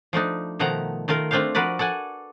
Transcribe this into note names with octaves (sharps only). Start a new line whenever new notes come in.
F3 A3 D4 D#4
B2 D#3 F3 A3 F#5 A#5
D#3 A3 F4 A#4
A3 C4 D4 F4 C5 F5
F3 F#4 A#4 B4 D5
A4 D5 F#5 G#5